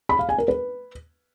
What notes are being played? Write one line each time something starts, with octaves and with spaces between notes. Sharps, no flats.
B5
F5
G#5
A#4
B4